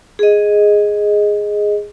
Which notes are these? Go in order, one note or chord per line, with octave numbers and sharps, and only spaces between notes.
G#4 D#5